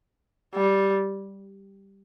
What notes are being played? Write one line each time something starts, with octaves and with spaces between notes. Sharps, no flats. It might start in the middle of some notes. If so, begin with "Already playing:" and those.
G3